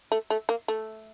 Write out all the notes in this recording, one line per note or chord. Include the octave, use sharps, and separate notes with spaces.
A3
A3
A#3
A3